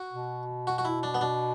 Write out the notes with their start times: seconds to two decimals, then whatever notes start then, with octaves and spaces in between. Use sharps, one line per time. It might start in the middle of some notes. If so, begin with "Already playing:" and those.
Already playing: F#4
0.13 B2
0.67 F#4
0.78 F#4
0.85 E4
1.03 D4
1.14 B3
1.21 B2 D4